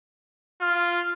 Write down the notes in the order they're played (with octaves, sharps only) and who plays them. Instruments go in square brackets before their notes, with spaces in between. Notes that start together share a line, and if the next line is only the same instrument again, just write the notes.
[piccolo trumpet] F4 [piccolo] F6